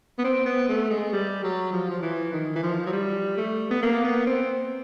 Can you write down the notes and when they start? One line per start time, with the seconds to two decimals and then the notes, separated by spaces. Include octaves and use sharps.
0.18 B3
0.24 C4
0.46 B3
0.68 A3
0.90 G#3
1.13 G3
1.43 F#3
1.72 F3
1.90 F3
2.02 E3
2.33 D#3
2.56 E3
2.63 F3
2.86 F#3
2.92 G3
3.37 A3
3.70 B3
3.82 A#3
4.04 B3
4.27 C4